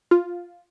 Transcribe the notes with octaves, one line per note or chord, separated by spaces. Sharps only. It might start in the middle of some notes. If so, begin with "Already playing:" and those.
F4